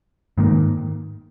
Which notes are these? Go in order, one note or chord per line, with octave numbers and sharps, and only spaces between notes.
G#2 D#3 A#3